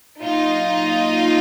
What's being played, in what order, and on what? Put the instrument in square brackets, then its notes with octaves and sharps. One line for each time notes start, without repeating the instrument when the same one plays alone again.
[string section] A#2 F#3 D#4 F4